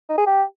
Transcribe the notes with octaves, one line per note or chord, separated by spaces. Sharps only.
D#4
G#4
G4